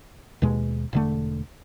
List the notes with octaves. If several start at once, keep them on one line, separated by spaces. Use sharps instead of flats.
D#2 B2 G#3
E1 D3 A3